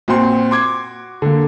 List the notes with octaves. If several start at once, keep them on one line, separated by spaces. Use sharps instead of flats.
A#2 C4 F#4 C6
C6 D6 G#6
D3 A#3